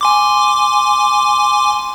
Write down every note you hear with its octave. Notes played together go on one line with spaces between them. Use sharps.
G#5 C6 D6